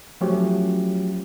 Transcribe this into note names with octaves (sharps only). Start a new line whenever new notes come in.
F3 F#3 A3 C#4 F#4 G4